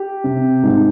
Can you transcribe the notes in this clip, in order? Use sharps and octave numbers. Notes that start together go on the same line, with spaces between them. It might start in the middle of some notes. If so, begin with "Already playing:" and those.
Already playing: G4
C3
G#2